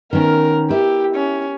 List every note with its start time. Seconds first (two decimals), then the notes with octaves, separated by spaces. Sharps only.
0.13 D#3 B3 C#4 A#4
0.70 E4 G4
1.15 C#4